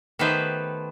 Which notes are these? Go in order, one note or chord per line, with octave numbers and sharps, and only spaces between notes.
D#3 A3 B3 G4 B4 C5